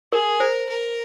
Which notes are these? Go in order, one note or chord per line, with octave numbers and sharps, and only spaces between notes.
G#4 A#4
A#4 C5
A#4